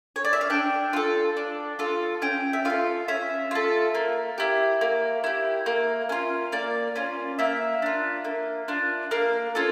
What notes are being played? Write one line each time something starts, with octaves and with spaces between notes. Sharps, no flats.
C#5
D5
E5
F5
D4 G5
F4 A4
D4
F4 A4
C#4 G5
E5
F4 A4 F5
C#4 E5
F4 A4
A#3
E4 G4
A#3
E4 G4
A#3
C#4 F4
A#3 D5
C#4 F4
A#3 E5
D4 F4
A#3
D4 F4
A#3 F5
C#4 F4 A4